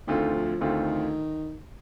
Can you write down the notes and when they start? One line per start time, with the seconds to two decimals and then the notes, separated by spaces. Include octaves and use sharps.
0.07 D2 D3 D#3 A3 C4 F4
0.34 F3
0.61 D2 D3 D#3 A3 C4 F4